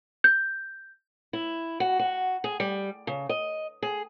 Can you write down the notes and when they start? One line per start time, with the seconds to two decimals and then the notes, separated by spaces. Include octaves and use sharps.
0.24 G6
1.33 E4
1.80 F#4
1.99 F#4
2.44 G#4
2.60 G3
3.07 C#3
3.29 D#5
3.82 G#4